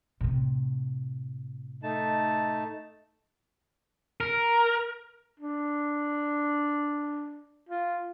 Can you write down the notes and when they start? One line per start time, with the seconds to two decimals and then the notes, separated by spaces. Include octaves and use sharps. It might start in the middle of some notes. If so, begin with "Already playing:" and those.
0.21 A2 C3
1.83 A3 D#4 A5
4.20 A#4
5.40 D4
7.69 F4